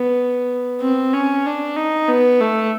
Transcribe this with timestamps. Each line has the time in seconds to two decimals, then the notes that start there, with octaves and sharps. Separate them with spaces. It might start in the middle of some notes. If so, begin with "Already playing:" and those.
Already playing: B3
0.82 C4
1.13 C#4
1.46 D4
1.76 D#4
2.08 B3
2.41 A3